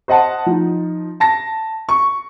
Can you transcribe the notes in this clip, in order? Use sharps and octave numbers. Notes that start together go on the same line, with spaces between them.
C5 D#5 F#5 A5
F3 D#4
A5 A#6
C#6